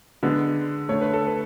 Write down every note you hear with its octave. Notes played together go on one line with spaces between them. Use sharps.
D3 G#3 B3
D3 A3 C#5
B4
A4
B4